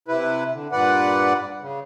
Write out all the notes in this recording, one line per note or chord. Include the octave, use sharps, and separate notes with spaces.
C3 E4 B4
D3
G2 A#2 B4 D5 F#5
C#3